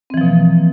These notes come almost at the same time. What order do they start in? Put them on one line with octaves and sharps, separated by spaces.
C4 E3 F3 B2 A#3